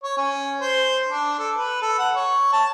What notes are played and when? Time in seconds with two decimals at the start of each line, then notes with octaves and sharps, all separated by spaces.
0.03 C#5
0.17 C#4
0.60 C5
1.09 D4
1.39 A4
1.56 B4
1.82 A4
1.99 F#5
2.16 C#5
2.53 A5